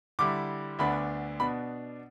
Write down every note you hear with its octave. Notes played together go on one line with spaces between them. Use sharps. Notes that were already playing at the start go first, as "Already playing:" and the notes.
D3 G3 E4 D6
D2 D3 B3 D4 B5
B2 B3 D4 B5